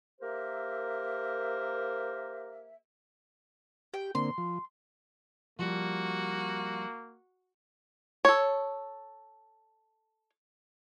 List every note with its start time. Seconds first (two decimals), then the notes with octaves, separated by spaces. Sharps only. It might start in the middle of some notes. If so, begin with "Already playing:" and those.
0.21 A#3 G4 A#4 C5 E5
3.94 G4 G5
4.15 D3 A#3 C4 C6
4.38 F3
5.59 F3 G3 A#3 F#4
8.25 A4 C#5